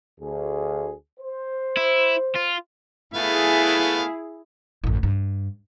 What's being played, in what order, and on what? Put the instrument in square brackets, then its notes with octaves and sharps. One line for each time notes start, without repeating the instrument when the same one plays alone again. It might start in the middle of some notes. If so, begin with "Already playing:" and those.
[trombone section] D2 G#4
C5
[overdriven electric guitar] E4
F4
[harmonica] A3 B3 F5 [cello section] E4 G#4
[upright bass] A1 F#2
G2